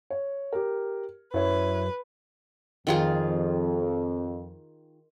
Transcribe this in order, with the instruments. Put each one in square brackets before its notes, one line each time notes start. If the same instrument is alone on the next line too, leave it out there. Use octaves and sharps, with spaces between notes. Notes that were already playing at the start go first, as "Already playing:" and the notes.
[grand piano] C#5
G4 A#4
[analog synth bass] F#2 [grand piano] E4 C#5 [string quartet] B4
[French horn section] F2 [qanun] D#3 F4 G#4